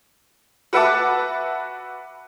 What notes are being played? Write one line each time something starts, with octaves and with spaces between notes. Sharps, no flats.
F#4 B4 E5 F#5 A5 D6